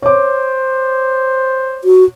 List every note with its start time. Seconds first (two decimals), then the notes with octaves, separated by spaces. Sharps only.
0.02 C5 C#5 D6
1.84 F#4